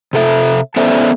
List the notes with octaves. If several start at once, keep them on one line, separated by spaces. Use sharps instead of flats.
C3 A4 E5
B3 C#4 A4 C5 D5 E5